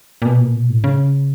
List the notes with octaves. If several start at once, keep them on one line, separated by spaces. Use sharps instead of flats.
A#2
B2
A#2
B2
A2
C#3